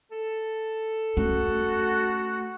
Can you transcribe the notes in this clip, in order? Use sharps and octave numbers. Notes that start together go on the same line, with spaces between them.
A4
A3 C#4 F#4